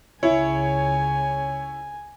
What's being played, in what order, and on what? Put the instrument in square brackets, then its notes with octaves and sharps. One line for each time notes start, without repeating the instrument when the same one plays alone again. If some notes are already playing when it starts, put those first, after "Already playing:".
[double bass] C#2 C#3 [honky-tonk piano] E4 [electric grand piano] C#5 [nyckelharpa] G#5